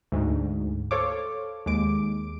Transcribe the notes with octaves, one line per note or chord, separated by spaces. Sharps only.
D2 G#2
A4 C5 C#5 F5 D6
D#2 G#3 D6 D7